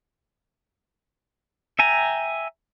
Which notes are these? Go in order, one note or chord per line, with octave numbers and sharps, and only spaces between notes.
E5 G5 G#5 A#5